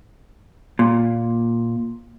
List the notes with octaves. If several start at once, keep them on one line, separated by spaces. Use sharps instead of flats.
A#2